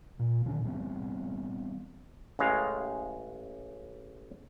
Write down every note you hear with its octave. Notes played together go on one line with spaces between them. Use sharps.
A#2
A#2 D3 D#3 C#4
E3 G3 B3 C4
A1 C#3 G#3 F5